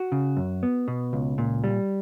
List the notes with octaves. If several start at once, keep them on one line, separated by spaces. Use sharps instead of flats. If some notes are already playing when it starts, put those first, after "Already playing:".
Already playing: F#4
C#3
F#2
B3
B2
C#2
A#2
G3